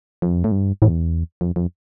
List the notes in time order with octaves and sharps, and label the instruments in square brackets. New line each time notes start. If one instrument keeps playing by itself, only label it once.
[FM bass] F2
A2
G2
[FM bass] E2 [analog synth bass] A2
[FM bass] F2
F2